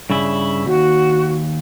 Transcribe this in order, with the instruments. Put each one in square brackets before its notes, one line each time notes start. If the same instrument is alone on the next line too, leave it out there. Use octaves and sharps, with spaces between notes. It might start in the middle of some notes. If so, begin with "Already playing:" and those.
[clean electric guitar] G2 C#3 E4
[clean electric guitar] D#2 [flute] F#4